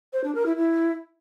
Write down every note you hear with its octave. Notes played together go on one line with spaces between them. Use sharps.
C5
D4
A#4
E4
E4